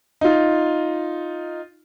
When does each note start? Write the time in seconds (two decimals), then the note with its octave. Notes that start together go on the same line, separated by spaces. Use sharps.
0.21 D#4 F4